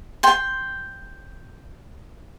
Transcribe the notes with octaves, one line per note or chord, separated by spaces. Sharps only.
G5 C6